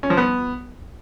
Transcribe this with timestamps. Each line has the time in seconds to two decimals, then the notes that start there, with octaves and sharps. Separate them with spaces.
0.03 C#4
0.10 F3
0.17 B3